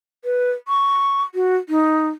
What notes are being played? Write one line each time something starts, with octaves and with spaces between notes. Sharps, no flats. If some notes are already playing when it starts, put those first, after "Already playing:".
B4
C#6
F#4
D#4